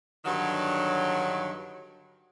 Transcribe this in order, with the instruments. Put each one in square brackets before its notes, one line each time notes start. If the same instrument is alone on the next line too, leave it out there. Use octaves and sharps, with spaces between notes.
[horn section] G2 D3 D#3 F#3